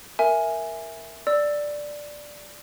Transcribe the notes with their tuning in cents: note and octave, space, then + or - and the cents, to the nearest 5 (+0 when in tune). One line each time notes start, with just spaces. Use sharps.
A#4 +0 E5 +0 G#5 +0
D5 +0 E6 +0